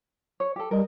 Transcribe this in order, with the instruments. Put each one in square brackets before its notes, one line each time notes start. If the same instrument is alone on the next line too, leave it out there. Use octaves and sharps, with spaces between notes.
[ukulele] C#5
G4 A4
[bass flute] G3 [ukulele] A#4 D#5